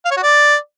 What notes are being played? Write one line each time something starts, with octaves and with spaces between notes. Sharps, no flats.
F5
C#5
F#4
D5